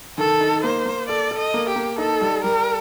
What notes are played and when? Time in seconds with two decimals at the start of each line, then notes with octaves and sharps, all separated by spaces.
0.18 D#3 A4
0.40 D#4
0.63 A#3 C5
0.85 A#3
1.08 A4 D5
1.31 A4
1.38 D#5
1.54 A#3
1.69 G4
1.76 A#3
1.98 D#4 A4
2.21 G3
2.44 G3 A#4